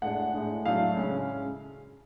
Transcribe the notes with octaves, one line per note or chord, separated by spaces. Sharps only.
A2 G#3 D4 F#5
A2 G#3 D4
A2 F#3 A3 D4 F5
C#3 G#3 C#4